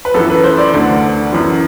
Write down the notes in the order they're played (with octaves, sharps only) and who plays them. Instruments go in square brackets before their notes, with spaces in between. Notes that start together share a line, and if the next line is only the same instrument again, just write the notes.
[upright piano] B4
F#2 E3 A4
B4
C5
D5
D2 D3
F#2 E3